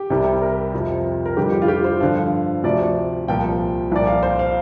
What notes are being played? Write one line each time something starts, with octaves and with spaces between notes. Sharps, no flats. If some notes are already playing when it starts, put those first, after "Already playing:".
Already playing: G4
C2 C3 G3
A#4
F2 C3 F3
A#4
F2 D3 G3 G4
G4
F4
G4
C5
G2 D3 F3 F5
D2 C3 F3 D5
C2 A#2 F3 G5
C2 A#2 F3 D5
F5
C5
F5